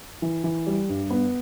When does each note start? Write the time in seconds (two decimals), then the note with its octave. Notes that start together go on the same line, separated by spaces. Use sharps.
0.22 E3
0.44 E3
0.67 G3
0.89 G2
1.10 B3